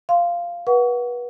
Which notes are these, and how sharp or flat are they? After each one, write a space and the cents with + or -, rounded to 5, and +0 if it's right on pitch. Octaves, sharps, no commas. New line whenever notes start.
F5 -10 C6 +0
B4 -30 F#5 +0 C#6 +35